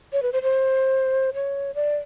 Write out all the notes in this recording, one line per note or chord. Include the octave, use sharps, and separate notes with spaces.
C#5
B4
C5
C5
C#5
D5